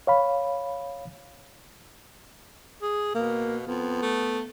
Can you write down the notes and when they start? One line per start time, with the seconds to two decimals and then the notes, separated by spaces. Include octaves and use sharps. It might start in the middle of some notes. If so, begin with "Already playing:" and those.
0.07 C#5 F5 B5
2.82 G#4
3.15 B2 A#3
3.67 F2 B3
4.02 A3